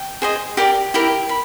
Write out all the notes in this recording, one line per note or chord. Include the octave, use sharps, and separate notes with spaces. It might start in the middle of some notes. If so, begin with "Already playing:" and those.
Already playing: G5
G#4 C5 D#5
G4 A#4 D5
E4 G4 A#4
B5